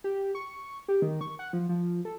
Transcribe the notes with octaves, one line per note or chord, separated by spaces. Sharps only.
G4
C#6
G4
D#3
C#6
F#5
F3
F3
A4